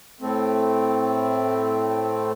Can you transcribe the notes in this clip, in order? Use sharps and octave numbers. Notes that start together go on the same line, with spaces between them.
A2 A3 C4